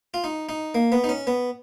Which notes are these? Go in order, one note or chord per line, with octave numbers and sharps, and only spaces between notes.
F4
D#4
D#4
A#3
B3
D#4
C#4
B3